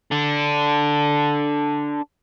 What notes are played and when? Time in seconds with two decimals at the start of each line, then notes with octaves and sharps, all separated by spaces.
0.12 D4 A4